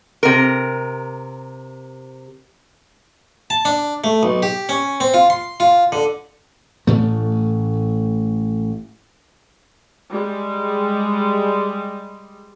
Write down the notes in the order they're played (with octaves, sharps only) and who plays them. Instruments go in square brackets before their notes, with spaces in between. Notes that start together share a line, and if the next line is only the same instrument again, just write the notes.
[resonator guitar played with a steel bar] C3 A#4
[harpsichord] A5
D4
A3
B1
G4
C#4
C4
F4
C6
F4
D3
[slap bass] A1 A2 A3
[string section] G3 G#3